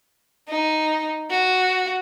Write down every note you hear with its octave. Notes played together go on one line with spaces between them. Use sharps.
D#4
F#4